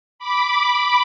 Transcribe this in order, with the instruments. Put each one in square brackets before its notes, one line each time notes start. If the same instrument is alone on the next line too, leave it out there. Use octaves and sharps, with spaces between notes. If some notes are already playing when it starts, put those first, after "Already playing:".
[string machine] B5 D6